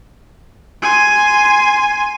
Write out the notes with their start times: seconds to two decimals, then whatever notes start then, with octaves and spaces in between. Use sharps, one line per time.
0.82 G#5 C6